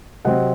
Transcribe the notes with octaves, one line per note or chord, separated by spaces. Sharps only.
C3 F#3 C4 D#5 F#5